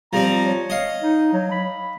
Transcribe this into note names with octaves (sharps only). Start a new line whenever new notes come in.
F3 G3 C4 A#5
C#5
D#5 F5
D#4
F#3
B5